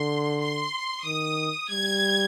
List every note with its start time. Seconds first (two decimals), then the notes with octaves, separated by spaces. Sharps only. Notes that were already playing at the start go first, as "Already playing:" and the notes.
Already playing: D3 C6
0.40 C6
1.05 D#3 D#6
1.71 G3 G#6